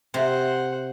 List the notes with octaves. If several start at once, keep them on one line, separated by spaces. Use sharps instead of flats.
C3 C5 F#5